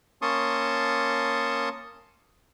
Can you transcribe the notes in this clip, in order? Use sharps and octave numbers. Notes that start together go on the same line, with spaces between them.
A#3 C#4 A5 C6 C#6 D#6